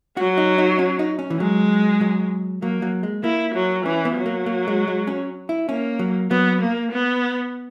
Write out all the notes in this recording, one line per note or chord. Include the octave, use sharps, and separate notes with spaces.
F#3 F#4
D#4
D#4
C#4
D#4
C#4
E3
F#3 G#3
F#3
F#3 A#3
F#3
G#3
A#3 E4
F#3
E3 C#4
B3
F#3
A#3
A#3
G#3
G#3
C#4
E4
A#3 C#4
F#3
F#3 B3
A#3
B3